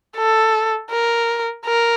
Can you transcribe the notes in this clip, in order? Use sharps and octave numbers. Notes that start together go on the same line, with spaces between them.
A4
A#4
A#4